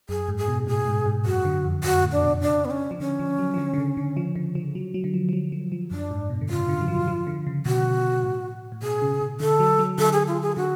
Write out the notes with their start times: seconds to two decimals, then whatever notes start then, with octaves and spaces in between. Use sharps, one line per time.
0.09 F#2 G#4
0.28 G#2
0.38 G#4
0.48 B2
0.67 A2 G#4
0.87 G#2
1.06 G#2
1.26 F#2 F#4
1.45 D3
1.64 F2
1.84 F#2 F#4
2.03 A2
2.12 D4
2.22 B2
2.41 C#3 D4
2.65 B3
2.71 C#4
2.91 F3
3.00 D3 C#4
3.19 F3
3.39 F#3
3.54 F3
3.58 D3
3.74 D3
3.78 C#3
3.97 D3
4.17 F3
4.36 D3
4.55 F3
4.75 F#3
4.94 F#3
5.04 D3
5.14 F3
5.29 F3
5.33 F#3
5.52 F3
5.72 F3
5.91 F#2 D4
6.11 G#2
6.30 B2
6.41 D3
6.49 C#3 F4
6.69 D3
6.81 F#3
6.88 F3
7.07 F3
7.27 D3
7.47 C#3
7.66 B2 F#4
8.24 A2
8.72 A2
8.82 B2 G#4
9.02 C#3
9.21 C#3
9.40 D3 A4
9.60 F#3
9.79 F#3
9.98 D3 A4
10.13 G#4
10.28 F4
10.42 G#4
10.56 D3 F#4